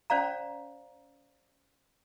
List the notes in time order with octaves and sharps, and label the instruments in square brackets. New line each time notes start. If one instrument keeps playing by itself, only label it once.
[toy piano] C#4 C5 D5 F5 A#5